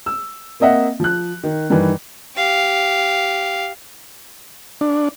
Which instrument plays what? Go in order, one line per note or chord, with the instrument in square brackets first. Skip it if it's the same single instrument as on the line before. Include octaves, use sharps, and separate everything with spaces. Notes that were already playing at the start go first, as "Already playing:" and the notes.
[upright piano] E6
A#3 C4 D#5 E5 F#5
F3 F#6
D#3
G2 D#3 E3
[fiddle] G4 F5
[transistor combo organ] D4